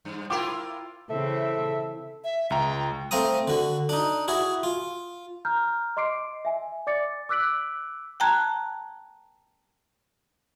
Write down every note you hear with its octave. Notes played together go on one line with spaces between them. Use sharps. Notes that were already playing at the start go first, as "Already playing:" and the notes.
G2
E4 F4 A#4 G5 D6
C#3 E3 C4 A4 E5
E5
C#2 G5 A#5
A3 C4 F5 A#5 D#6
D3 F#4
D4 D#4
E4 F#4 G#4
F4
A#5 F6 G6
D#5 C6 D6 C7 D7
E5 G#5
D5 D6 A6 C#7
D6 E6 F#6 B6 D7 F#7
G5 A5 A#5 F#6 G#6